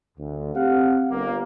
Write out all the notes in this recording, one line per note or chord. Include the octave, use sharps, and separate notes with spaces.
D2
C4 G4 F5 F#5
G1 A#3